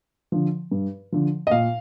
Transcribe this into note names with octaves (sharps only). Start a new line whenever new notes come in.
D3 F3
G2
D3 F3
D#5
A#2 F5